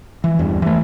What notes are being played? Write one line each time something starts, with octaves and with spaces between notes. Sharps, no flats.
E3
E2 G2
E3 A3